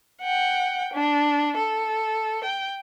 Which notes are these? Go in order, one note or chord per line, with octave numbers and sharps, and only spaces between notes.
F#5 G5
D4
A4
G5